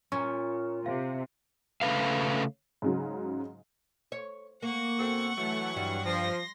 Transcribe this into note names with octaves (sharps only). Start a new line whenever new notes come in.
A#2 C#4 C#6
C3 F5
C#3 A3 B4 F5
G#2 C#3 F#3
C#5
A#3 F#5 C#6
B2 C4 A4
E3 F#3 A3
G2 G3
F3 C6 A#6